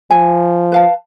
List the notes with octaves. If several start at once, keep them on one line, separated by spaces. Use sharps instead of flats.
F3 G#5
B4 F5 A5